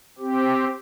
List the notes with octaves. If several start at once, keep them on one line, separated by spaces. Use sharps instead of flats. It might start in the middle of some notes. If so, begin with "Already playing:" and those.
C4 G4